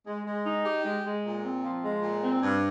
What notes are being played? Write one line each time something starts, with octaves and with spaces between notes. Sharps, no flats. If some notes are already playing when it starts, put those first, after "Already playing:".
G#3
G#3
D#4
G4
G#3
G#3
A#2
C4
F3
G#3
A#2
C4
G2